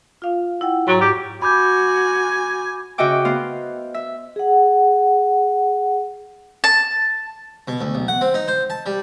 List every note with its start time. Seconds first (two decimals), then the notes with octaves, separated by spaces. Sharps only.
0.22 F4 F5
0.61 E4 F#5 G5
0.88 G#2 F#3 A#5 A6
1.01 G4
1.42 F#4 G#5 B5 D6 G6
2.98 C#3 F#4 D#5 E5 G5 D6
3.25 B3 C5 F5
3.94 E5
4.36 G#4 F#5
6.64 A5
7.68 B2
7.81 D2
7.95 B1
8.08 F#5
8.21 C4
8.34 D#4
8.48 C5
8.70 A5
8.86 G3